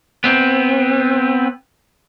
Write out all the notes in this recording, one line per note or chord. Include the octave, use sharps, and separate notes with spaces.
B3 C4